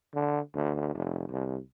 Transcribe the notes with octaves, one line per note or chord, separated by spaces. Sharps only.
D3
D2
F1
C2